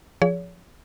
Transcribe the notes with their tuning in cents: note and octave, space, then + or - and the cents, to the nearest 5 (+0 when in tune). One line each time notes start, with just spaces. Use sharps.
F3 +0 G#4 +0 C#5 +40